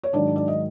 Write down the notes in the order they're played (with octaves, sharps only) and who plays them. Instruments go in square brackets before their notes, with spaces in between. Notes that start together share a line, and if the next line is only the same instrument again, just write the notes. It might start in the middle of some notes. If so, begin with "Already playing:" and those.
[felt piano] C#5
[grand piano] G#2 D#3 F#3 [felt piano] D4 D5
[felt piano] D5
D#5